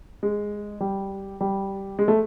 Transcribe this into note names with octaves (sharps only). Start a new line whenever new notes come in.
G#3
G3
G3
G#3
A3